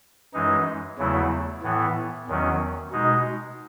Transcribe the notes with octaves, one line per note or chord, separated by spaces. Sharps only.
F#2 E3 G#3 D#4
E2 C#3 F#3 A3 E4
A2 E3 B3
E2 D#3 F#3 C#4
B2 G#3 D#4